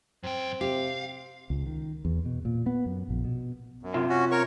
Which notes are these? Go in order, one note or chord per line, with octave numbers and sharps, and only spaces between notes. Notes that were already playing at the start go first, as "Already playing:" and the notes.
F#2 C4 G5
C3 G4 F5
C#2
D#3
E2
B2
A#2
B3
F#2
A#1
B2
F#2
C3 F4 E5
C#4 F#4
A#4 C#5 C#6